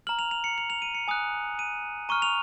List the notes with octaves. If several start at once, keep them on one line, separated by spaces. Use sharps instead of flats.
A#5 F6 F#7
F7
F7
C#7
F7
F7
D#7
C#7
G#5 D#6 F#6
D#7
A#5 C#6 F6 D#7
F7